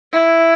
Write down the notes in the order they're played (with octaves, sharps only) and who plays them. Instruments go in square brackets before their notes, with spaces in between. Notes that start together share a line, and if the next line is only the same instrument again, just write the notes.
[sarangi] E4